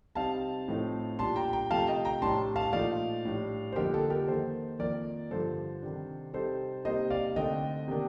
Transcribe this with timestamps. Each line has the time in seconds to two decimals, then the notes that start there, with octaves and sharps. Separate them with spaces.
0.15 C3 G3 C4 D#4 F5 A5
0.68 A2 F3 A3 C4 D#4
1.18 A#2 G3 D4 A5 C6
1.36 G5 A#5
1.53 G5 A#5
1.71 C3 F3 A3 F5 A5
1.87 D#5 G5
2.05 G5 A#5
2.22 A2 G3 D4 A5 C6
2.56 F5 A5
2.73 A#2 F3 A3 D#4 D5 F5
3.25 A2 G3 D4
3.72 C5
3.76 F2 D3 G3 A#3 D#4 G4 A#4
3.94 A4
4.10 G4 A#4
4.27 D#3 A#3 D#4 A4 C5
4.79 F2 D#3 A#3 A#4 D5
5.31 G2 D3 F3 A4 C5
5.82 C3 D#3 G3 D4
6.34 C3 G3 C4 D#4 A4 C5
6.85 C3 G3 A#3 D#4 C5 D#5
7.10 D5 F5
7.36 D3 A3 C4 D#4 D#5 G5
7.88 C3 D#3 A#3 D4